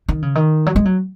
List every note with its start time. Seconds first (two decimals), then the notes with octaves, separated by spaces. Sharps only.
0.09 D#3
0.22 C#3
0.35 D#3
0.66 F#3
0.76 G#3
0.85 F#3